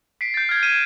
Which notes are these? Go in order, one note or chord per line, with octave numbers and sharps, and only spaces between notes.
B6 C7 D7
G6 A6
F6 G#6
G#6 D#7 E7